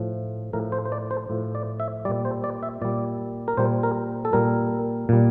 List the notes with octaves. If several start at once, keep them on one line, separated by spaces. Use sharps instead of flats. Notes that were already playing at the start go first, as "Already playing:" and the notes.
Already playing: A2 F3
A2 F3 A#4
C5
C5
D5
C5
A2 F3
D5
E5
A#2 G3 D5
C5
D5
E5
A#2 G3 D5
A#4
A#2 G3 C5
A#4
A4
A#2 G3 A#4
A#2 G3